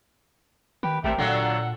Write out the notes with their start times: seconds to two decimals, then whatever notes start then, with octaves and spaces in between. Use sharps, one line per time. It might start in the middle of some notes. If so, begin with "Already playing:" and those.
0.83 D#3 G4 B4
1.04 A1 C3 A3 G4 A#4 D5
1.18 A#2 D3 F#3 F4 A4 F#5